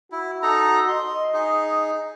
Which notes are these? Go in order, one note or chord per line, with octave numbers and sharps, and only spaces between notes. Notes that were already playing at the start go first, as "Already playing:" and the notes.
E4 F#4
D#4 A4 A#5
D#5 C6
D#4 G#4